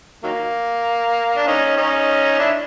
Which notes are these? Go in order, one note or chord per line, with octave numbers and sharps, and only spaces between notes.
D#3 F#3 A#3
D4
C#4 D#4
C#4 D#4
D4 E4